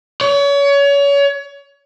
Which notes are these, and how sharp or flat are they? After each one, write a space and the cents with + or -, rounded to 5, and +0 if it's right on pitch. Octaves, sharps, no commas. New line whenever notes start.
C#5 +30